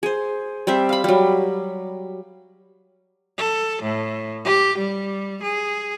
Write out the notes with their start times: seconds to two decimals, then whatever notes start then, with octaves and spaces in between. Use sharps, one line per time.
0.03 G#4 C5
0.67 G3 C4 C5 E5
0.89 F5 B5
1.04 F#3 G3
3.38 A4
3.82 A2
4.44 G4
4.78 G3
5.42 G#4